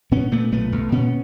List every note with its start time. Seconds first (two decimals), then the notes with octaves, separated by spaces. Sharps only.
0.12 A#2 B3 C#4
0.32 A#2 A3 B3
0.52 B1 A3 B3
0.72 B1
0.92 A#2 B3 C#4